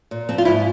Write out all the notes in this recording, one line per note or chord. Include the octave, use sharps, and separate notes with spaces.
A#2
F3 C4
F4
G#2 E4